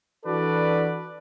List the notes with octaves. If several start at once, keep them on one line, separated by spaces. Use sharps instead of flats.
E3 D4 F#4 A4 B4 D5